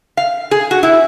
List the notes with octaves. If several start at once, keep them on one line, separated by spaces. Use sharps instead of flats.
F5
G#4
F#4
E4